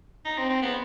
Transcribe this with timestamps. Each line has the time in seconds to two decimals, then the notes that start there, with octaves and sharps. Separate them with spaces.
0.25 D#4
0.38 C4
0.49 C4
0.62 B3